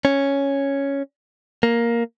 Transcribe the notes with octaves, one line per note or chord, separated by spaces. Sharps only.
C#4
A#3